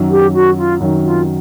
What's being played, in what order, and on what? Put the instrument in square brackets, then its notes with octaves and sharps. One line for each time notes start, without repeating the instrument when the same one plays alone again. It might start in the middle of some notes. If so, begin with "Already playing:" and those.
Already playing: [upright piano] F#2 D#3 F#3
[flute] G4
F#4
F4
[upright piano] F#2 D#3 F#3
[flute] F4